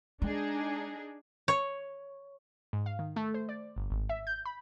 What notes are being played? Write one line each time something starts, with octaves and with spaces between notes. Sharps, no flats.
G#3 D4 D#4 G#4
C#5
G#2
F5
D#3
A3
C5
D5
G1
G#1
E5
G6
B5